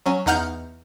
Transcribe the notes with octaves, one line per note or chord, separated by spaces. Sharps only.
F#3 C#4
E2 D#4 F#5 F6 G6